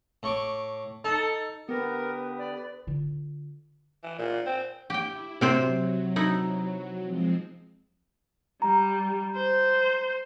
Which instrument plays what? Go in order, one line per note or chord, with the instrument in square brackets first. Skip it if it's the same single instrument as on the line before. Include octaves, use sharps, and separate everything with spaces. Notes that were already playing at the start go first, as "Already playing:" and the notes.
[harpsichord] A2 C#6 D6
[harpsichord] D#4 [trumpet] A4
[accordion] D3 G4 D#6 [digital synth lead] B3 [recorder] A#4 [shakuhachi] B4
[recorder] D5
[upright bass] D3 F4
[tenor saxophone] E3
A#2
C4
[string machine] E4 [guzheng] G4 G5
[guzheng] C3 C4 C5 [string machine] F#3
[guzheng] D#4 E4
[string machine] F3 G#3 C4
[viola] G3 [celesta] A#5
[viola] C5